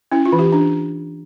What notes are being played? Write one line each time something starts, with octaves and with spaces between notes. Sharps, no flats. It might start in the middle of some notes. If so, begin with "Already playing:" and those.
C#4 E4
F4
E3
G4
D4